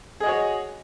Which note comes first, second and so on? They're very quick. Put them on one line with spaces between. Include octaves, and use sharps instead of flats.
G#4 D#5 F#4 C#5